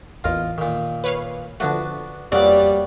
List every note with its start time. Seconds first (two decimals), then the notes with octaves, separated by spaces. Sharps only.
0.24 A1 E2 F4 A#4 D#5
0.58 A#2 D#3
1.04 B4 C#5 F5
1.60 D3 F3 A3 B3 D4 F#4
2.32 F2 F#3 G3 A#3 B3 D5